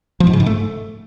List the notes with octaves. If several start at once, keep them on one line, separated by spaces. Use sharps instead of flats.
F3
G#2
C#3
G#2
A3